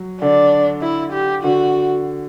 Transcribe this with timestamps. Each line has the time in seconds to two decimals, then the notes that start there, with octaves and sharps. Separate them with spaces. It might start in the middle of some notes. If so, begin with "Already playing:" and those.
Already playing: F#3
0.21 D3 D4
0.82 E4
1.13 G4
1.43 D3 F#4